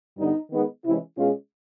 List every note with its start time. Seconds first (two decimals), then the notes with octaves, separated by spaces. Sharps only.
0.17 G2 D3 G3 B3 D#4
0.50 D#3 G#3 B3 D#4
0.84 C3 E3 G#3 C#4 E4
1.17 B2 G#3 C#4 F4